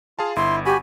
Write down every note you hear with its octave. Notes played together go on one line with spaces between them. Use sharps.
F4 G#4 F5 A5
G1 E4 C6
F#4 G4 G#5 B5